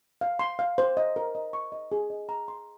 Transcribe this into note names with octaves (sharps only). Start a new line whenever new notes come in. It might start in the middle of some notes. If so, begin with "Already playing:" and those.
F5
C6
F5
C5
D#5
A#4
D#5
C#6
D#5
G#4
D#5
A#5
C6